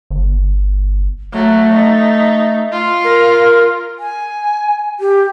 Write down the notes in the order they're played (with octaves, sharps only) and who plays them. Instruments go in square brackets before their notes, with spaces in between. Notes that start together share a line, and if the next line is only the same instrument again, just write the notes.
[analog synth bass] G1
[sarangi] F#3 [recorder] A3
[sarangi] D#4
F4
[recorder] A#4
[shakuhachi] G#5
G4